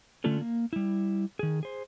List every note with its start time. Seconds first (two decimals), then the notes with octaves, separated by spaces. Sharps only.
0.24 D3 A3 C#4 D4 F4 A4
0.41 A#3
0.73 G3 E4
1.39 D#3 G#4
1.63 G#4 C5